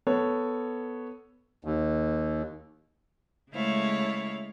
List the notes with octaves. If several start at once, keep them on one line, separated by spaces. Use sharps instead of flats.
B3 A4 C#5
D#2
C#3 G#3 A3 E4 C#5 F5